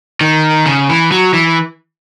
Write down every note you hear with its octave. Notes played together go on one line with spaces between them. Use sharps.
D#3
C#3
E3
F#3
E3